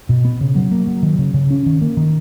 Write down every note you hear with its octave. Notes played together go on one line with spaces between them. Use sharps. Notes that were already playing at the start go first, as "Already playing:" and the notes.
B2
B3
C#3
F#3
A#3
F#3
D#3
C#3
C#3
C#4
D#3
A#3
D#3